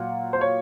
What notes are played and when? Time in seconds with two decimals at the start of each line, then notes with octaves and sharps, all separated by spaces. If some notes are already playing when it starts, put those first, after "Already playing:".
Already playing: A#2 F#3 A#3 F4 F#5
0.33 C5
0.41 C#5